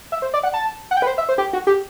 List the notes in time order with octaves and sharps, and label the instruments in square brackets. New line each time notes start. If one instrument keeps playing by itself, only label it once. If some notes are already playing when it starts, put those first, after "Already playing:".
[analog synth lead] E5
C5
D5
F#5
A5
F#5
G5
B4
C5
E5
C5
G4
F#4
G4